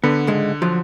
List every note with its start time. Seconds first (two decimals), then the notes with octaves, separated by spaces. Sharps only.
0.04 D3 B3
0.27 C#2 G#2 G#3
0.62 F3 F#3